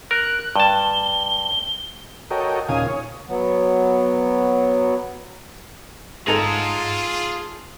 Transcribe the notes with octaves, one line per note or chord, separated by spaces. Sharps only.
A#4 F#6
G2 A5 G7
F#4 A4 A#4 C#5 D#5 G5
D#2 A#2 C#3 F5 G#5 D#6
C#5
F#3 B3
G#3 D#4 F4 G#4 A4 A#5